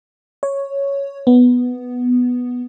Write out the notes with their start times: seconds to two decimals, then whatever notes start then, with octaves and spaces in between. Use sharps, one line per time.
0.43 C#5
1.27 B3